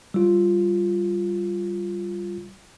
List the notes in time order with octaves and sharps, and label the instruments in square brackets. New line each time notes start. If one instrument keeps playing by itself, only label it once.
[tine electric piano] G3 F4